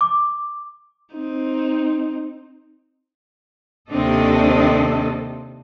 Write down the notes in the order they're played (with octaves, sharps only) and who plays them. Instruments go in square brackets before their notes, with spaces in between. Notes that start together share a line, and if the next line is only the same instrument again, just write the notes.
[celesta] D6
[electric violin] C4 D#4
[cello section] D#2 C3 C4 D4 A4 D#5